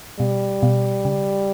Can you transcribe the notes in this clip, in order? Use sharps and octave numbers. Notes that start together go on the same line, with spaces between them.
B2 G3
B2
C#3